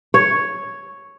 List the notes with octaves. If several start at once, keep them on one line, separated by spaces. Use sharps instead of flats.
C#5